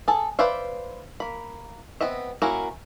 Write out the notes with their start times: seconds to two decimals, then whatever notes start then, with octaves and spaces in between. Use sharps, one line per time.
0.08 G#4 A4
0.39 B4 C5 D5 E5 F5
1.20 A#3 B5
2.01 B3 C4 D#5 E5
2.42 A#3 C#4 E4 F#4 A#4